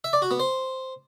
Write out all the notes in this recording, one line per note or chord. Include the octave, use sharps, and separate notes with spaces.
E5
D5
F#4
B3
C5